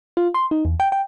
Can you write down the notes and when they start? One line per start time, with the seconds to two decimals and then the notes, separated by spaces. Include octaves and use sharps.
0.17 F4
0.34 C6
0.51 D#4
0.65 E2
0.80 G5
0.92 G5